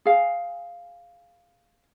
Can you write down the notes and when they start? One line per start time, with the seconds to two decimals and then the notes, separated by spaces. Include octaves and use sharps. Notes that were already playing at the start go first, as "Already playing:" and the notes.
0.05 G#4 F5